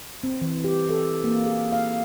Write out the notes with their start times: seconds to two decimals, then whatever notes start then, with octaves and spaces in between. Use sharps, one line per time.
0.23 C4
0.42 E3
0.64 G4
0.89 A4
1.24 A#3
1.46 G#4
1.72 F5